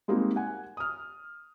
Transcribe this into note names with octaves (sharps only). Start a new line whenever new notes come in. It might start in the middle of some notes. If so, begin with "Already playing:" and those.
G3 G#3 A#3 C4 D#4 F#4
F#5 G#5
D#6 F6